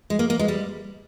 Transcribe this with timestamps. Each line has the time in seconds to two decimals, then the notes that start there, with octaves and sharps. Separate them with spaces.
0.10 G#3
0.19 A#3
0.30 A#3
0.39 G#3
0.48 G3